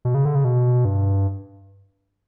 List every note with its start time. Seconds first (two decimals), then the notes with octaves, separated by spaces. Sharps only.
0.05 B2
0.14 C#3
0.25 D3
0.35 C#3
0.45 B2
0.85 G2